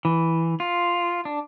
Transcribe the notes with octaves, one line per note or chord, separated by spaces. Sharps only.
E3
F4
D4